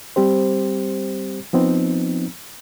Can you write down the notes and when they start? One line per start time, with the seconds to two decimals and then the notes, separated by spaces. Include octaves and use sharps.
0.16 G3 C4 G4 C5
1.53 F3 B3 C4 D#4